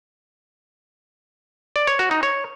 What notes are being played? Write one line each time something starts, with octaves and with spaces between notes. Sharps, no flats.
D5
C#5
F#4
D#4
C#5